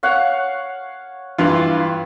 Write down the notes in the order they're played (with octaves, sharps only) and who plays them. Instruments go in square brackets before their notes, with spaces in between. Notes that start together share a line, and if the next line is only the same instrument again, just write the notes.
[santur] C#5 F5 F#5
[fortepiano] G2 E3 F4